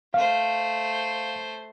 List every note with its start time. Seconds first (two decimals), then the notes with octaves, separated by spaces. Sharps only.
0.14 A3 C5 F5